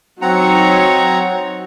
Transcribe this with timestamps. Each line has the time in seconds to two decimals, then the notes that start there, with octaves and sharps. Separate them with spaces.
0.22 F#3 C4 D#4 C#5 F#5 A#5